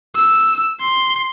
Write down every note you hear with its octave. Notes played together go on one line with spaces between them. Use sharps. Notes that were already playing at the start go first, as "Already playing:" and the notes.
E6
C6